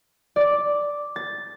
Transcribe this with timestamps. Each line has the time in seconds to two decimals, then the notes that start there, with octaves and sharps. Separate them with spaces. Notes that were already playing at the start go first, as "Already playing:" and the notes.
0.36 D5
1.16 A6